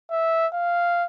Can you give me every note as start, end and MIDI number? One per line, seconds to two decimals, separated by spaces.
0.11 0.47 76
0.53 1.06 77